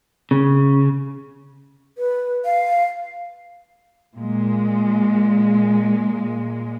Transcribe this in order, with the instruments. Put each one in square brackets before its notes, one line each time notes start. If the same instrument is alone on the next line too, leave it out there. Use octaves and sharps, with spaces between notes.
[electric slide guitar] C#3
[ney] B4
F5
[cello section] A#2 G#3